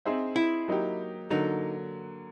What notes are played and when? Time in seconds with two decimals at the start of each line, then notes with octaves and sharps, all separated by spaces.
0.05 C4 D#4 G#4 C5 E5
0.36 E4
0.68 F#3 A#3 D#4 G4
1.30 D3 F#3 A#3 D#4